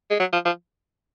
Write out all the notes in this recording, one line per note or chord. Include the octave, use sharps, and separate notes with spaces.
G#3
F#3
F3
F3